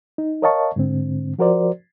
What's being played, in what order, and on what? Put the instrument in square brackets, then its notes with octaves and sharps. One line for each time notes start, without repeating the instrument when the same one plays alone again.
[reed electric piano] D#4
A#4 C#5 D#5 F5 A5 C#6
G#2 D3 C4
F3 F#4 A#4 C5 D5